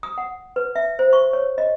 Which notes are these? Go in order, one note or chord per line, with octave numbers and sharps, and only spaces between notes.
D#6
F#5
B4
E5
C5
C#6
C#5
D#5